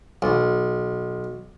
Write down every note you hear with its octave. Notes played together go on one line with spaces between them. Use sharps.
B1